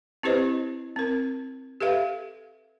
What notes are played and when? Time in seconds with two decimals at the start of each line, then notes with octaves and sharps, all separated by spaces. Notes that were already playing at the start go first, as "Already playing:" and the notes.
0.23 C4 E4 G4 B4 C5 D#5
0.96 C4 A#4
1.81 G4 A4 B4 E5 F5